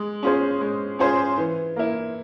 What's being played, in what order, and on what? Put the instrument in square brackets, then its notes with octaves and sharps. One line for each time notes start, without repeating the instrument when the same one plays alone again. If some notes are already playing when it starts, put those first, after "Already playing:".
Already playing: [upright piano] G#3
C#4 F4 G#4 C5
G#3
C#4 F4 G#4 C5
E3
A#3 E4